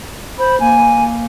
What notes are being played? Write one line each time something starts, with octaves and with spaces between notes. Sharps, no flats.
C5 B5
A#3 G#5